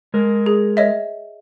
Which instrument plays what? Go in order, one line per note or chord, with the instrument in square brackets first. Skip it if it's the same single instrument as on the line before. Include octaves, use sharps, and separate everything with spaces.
[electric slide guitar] G#3 A#4
[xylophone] G#4
C#5 D#5 E5